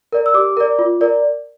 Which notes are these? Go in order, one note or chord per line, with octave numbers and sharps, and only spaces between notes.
A#4 D5
E6
G4 D6
A#4 D5
F4
A#4 D5